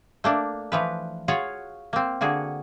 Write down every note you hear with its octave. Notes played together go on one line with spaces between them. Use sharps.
A3 A#3 D4
E3 F3 B4
F4 F#4 G#4 C#5 F5 F#5
A#3 C4
D3 A#3 F#4 G#4